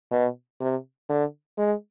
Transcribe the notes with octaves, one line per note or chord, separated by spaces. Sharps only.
B2
C3
D3
G#3